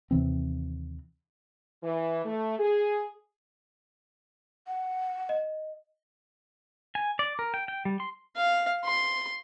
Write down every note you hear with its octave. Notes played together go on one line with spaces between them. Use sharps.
D#2 C3 E3 C4
E3
A3
G#4
F#5
D#5
G#5
D5
A#4
G5
G5
G3
C6
F5
C6